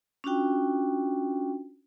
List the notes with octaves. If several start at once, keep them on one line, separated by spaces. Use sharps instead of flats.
C#4 D4 F4 F#4 G5